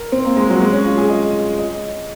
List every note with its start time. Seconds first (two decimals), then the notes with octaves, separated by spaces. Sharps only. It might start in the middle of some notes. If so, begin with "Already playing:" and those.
Already playing: A#4
0.12 C4
0.25 A#3
0.37 G#3
0.50 F#3
0.62 G#3
0.73 C#4
0.85 F4
0.98 G#4
1.09 D#5
1.58 D#5